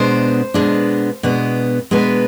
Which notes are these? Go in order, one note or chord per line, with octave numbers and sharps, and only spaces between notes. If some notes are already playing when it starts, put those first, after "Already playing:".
Already playing: B2 G#3 B3 D4 C5
B2 G#3 B3 D4
B2 G#3 B3 D4
B2 G#3 B3 D4 B4